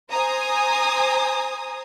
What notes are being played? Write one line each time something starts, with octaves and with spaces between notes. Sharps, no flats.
C5 G#5 A#5 D#6